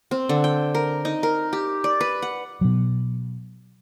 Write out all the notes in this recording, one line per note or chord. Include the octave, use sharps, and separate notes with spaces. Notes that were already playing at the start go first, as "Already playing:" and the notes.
C4
D3
G5
A#4
D#4
A#4
G4
D5
B4
F#5
B2 F#3